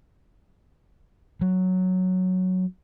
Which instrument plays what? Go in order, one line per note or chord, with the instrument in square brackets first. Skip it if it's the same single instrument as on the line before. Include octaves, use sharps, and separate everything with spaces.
[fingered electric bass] F#3